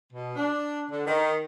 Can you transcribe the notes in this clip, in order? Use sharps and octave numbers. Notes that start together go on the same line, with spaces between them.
B2
D4
D3
D#3